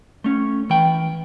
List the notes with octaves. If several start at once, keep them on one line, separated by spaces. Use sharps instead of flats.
A3 C#4
E3 G5